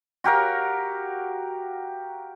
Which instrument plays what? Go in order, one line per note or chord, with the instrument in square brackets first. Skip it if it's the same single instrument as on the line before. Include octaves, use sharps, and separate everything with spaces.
[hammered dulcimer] F#4 G4 A#4 F5